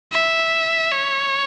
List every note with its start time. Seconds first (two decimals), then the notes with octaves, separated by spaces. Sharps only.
0.12 E5
0.91 C#5